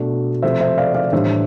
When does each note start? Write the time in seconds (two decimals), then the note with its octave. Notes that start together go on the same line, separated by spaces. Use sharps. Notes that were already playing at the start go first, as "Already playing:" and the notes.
Already playing: B2 A3 D4
0.42 C3 F3 A3 C5 E5
0.60 C5 E5
0.77 D5 F5
0.94 D5 F5
1.12 A2 E3 G3 D4 C5 E5